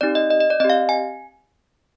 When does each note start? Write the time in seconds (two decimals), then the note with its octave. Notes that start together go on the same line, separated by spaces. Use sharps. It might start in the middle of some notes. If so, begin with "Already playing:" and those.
0.01 C4 D#4 G4 D5
0.15 D#5
0.30 D#5
0.40 D#5
0.50 D5
0.60 C4 D#5
0.64 G4
0.70 F5
0.89 G#5